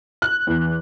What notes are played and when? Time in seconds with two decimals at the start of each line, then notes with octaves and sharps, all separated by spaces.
0.22 F#6
0.47 E2